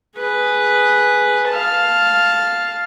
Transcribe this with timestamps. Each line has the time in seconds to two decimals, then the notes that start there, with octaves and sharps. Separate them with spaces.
0.17 G#4 B4
1.48 F5 A5